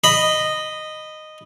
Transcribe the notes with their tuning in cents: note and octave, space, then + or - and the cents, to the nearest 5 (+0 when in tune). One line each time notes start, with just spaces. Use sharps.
D#5 -10 B5 +0